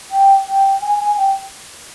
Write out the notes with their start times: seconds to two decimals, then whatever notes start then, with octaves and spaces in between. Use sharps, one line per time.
0.11 G5
0.46 G5
0.82 G#5
1.00 G#5
1.17 G5